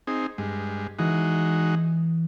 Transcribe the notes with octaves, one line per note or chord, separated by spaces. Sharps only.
C4 D#4 G#4
G2 G#3
E3 G#3 D#4 F#4